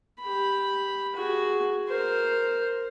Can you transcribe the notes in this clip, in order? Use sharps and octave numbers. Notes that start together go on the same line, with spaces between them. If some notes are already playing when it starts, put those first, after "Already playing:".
G4 B5
F#4 G#4
A#4 C5